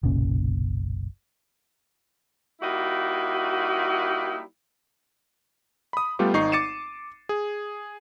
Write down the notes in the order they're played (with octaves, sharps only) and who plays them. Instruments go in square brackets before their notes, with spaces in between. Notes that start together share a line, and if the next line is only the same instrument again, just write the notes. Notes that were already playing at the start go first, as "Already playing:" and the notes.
[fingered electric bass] F#1 B1 A#2 C#4
[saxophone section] G3 A#3 D#4 E4 F#4
[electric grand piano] B5 D#6
G3 A3 B3 F4 G4
G#1 D#4 C#6 C7
D6 A6 C#7 D#7 E7
G#4